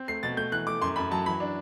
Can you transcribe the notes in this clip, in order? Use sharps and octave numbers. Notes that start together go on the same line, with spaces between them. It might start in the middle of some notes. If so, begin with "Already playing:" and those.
Already playing: C4
A3 C7
B2 A6
A3 G6
E3 F#6
A3 D6
F#2 C6
F#2 B5
F#3 A5
E3 B5
D4